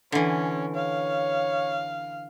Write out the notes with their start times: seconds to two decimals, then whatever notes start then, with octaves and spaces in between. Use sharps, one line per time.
0.12 D3 E3 C#4
0.76 C#5 F5